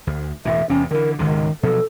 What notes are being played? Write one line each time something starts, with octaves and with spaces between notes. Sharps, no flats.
D2
E1 A2 E3 E5
E2 C3 C#4
D3 E3 A#4
G#1 C#2 C3 D#3
B2 F3 F#3 A4